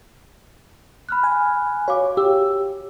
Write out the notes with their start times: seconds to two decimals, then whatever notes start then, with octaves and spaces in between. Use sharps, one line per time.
1.09 B5 F6 F#6
1.24 G#5
1.88 F#4 C#5 F5 D6
2.17 G4 E6